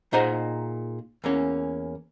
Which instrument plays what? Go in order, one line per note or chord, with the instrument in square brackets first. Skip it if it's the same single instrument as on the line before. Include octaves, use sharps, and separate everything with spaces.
[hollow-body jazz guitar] A#2 D#4 G#4 C5 D#5 F#5
E2 A#3 C#4